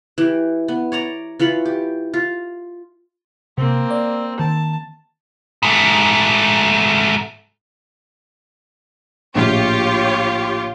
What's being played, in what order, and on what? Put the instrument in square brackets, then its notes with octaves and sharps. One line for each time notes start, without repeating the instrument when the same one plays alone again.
[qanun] E3 G4
B3
C#5 D5 A#5
E3 F4 C#5 B5
G4
F4
[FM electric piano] C3 [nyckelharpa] A#3 C4
[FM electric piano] D5
[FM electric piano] D#3 [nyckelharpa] A5
[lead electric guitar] G#2 A3
[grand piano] A#1 A2 [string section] F4 G4 C#5